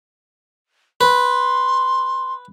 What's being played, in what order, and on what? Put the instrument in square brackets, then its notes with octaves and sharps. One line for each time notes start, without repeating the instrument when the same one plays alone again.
[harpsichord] B4 [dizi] C6